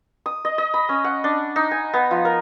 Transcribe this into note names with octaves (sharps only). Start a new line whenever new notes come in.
D#6
D#5
D#5
B5
C#4
F#5
D4
D#4
G#5
B3
F3
A#4